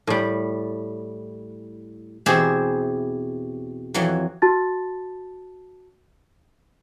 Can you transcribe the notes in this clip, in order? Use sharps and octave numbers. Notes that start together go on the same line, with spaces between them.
A2 G3
E2 B2 C4 G4 G#4 E5
F2 E3 F#3
F#4 A5 A6